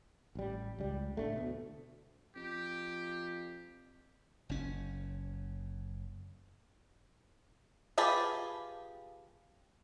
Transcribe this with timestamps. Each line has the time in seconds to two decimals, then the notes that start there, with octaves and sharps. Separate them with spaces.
0.35 A1 G3
0.79 C#2 G3
1.17 A2 D3 A3
1.36 D2 B2
2.36 F2 G4
4.49 F#1 C#4
7.98 F4 G4 G#4 B4 A5